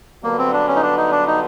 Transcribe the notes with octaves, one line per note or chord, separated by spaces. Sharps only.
G2 D3 F#3 A#3 B3
C4
D4
C#4
D#4
D4
D#4
D4
D#4